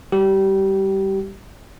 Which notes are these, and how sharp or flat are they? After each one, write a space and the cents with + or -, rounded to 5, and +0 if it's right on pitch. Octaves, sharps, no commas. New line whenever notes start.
G3 +0 G4 -25